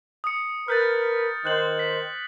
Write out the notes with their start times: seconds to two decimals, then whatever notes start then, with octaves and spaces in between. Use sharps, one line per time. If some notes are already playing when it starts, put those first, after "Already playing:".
0.24 D#6 C#7
0.68 A#4 B4 F6 G6 A6
1.45 D#3 C5 F#6 F#7
1.79 B6